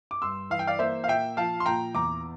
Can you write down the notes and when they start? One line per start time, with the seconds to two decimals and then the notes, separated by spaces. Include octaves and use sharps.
0.11 D6
0.22 G2 C6 E6
0.50 E3 F5
0.59 G5
0.67 D5 F5
0.79 A#3 C5 E5
1.04 F5
1.08 A#2 E5 G5
1.37 F3 F5 A5
1.60 C6
1.66 A#2 G5 A#5
1.95 E2 A#5 D6